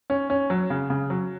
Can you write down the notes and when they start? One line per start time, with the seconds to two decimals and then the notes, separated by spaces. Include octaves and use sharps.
0.10 C#4
0.30 C#4
0.50 F#3
0.70 C#3
0.90 C#3
1.10 F#3